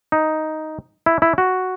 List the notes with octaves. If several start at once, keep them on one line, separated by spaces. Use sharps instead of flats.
D#4
E4
E4
F#4